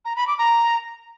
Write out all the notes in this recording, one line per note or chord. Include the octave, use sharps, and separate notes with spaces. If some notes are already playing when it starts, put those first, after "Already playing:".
A#5
B5
D6
A#5